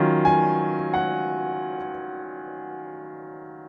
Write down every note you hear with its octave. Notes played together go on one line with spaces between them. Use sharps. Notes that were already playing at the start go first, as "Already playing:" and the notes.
Already playing: D#3 F#3 C#4 F4
G#5
F#5